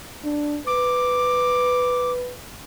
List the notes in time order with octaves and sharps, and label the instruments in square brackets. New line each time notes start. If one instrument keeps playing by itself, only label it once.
[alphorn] D4
[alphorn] B4 [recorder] D6